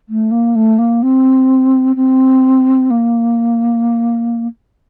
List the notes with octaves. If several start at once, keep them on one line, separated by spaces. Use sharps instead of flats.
A3
A#3
A3
A#3
C4
C4
A#3